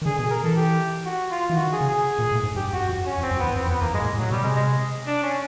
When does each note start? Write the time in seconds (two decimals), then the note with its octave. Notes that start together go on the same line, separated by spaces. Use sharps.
0.02 D#3
0.06 D3 G#4
0.18 B2 G#4
0.31 A#4
0.44 E3 A4
0.56 G4
1.06 F#4
1.31 F4
1.50 E3
1.56 D#3 F#4
1.73 G#4
1.81 C#3
1.89 G#4
2.19 A#2
2.32 A2
2.43 G#2
2.56 G2 G4
2.73 F#2 F#4
2.89 F2 F#4
3.06 C#4
3.18 F2
3.23 C4
3.31 F#2
3.40 E2 B3
3.56 F2 C4
3.63 E2
3.69 F2 B3
3.81 E2 A#3
3.94 G2 G#3
4.02 A2
4.06 G#2
4.18 A2 F#3
4.31 B2 G3
4.43 C3 G#3
4.56 G#3
5.06 D4
5.23 C#4